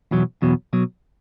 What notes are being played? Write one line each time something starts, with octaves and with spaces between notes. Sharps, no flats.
E2 B2 F#3
E2 B2 F#3
B2 F#3